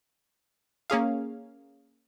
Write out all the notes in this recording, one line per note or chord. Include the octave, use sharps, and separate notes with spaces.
A#3 C#4 G#4 F5